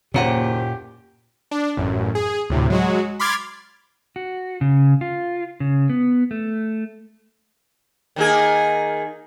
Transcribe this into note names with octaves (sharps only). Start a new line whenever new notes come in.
F#1 D#2 A#2 C#4 G4 A#4 C5 F#5
D4
A1 F#2
G#4
D2 A2 C3
F#3 G#3 F#4
B5 C6 D6 F6 G#6 A6
F#4
C#3
F4
C#3
B3
A3
D#3 A#3 G#4